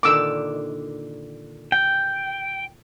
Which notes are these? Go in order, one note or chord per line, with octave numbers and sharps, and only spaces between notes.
A#2 D3 D#3 D6 E6
G5